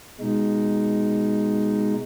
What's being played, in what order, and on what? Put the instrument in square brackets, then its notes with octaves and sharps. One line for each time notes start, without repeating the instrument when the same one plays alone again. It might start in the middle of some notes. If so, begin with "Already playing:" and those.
[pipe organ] B2 G#3 D#4